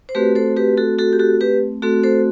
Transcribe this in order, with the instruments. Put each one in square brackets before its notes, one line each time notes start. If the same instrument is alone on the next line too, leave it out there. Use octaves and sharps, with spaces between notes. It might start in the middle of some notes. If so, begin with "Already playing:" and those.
[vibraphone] C5
A3 C4 F#4 G4 B4
A4 C5
G4 B4
F#4 A4
F#4 A4
G4
F#4 A4
G4 B4
A3 C4 F#4 A4
A4 C5